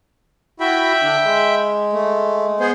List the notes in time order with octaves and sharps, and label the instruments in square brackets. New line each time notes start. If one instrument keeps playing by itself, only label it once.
[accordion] E4 F#4 [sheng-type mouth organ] E5 G5 B5
[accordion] D3 D4
G#3
[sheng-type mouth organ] A3
B3 G#4 C5